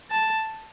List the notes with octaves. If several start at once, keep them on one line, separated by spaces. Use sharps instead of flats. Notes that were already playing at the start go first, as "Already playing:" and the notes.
A5